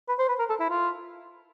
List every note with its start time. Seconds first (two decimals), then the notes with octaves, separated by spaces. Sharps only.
0.08 B4
0.19 C5
0.29 B4
0.39 A#4
0.49 A4
0.60 E4
0.70 F4